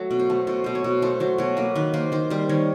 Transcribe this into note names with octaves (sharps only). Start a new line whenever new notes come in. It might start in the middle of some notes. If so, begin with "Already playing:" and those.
Already playing: F#3 A3
B2
C5
A3
B2 C5
B2 C5
C#5
B2
A3 C5
F#3 C5
B2 C#5
A#3 B4
D#3 B4
A#3 C5
D#3 C5
G3 C5
D#3 C#5